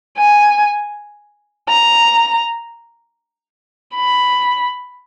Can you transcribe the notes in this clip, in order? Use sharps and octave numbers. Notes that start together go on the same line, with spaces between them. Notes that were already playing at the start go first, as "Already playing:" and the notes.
G#5
A#5
B5